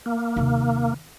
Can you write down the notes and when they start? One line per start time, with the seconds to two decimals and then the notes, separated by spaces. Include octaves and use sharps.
0.06 A#3
0.36 D#2 C3